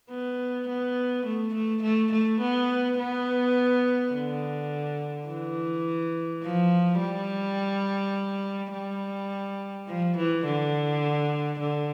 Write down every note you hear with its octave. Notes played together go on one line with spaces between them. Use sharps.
B3
B3
A3
A3
A3
A3
B3
B3
D3
E3
F3
G3
G3
F3
E3
D3
D3